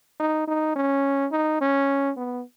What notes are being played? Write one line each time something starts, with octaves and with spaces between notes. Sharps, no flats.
D#4
D#4
C#4
D#4
C#4
B3